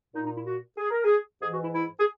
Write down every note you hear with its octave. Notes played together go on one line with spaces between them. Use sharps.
A#2 D#4
D#4
E4
F#4
G#4
A#4
G#4
G#2 E3 G#4
F#4
E4
E4
G#4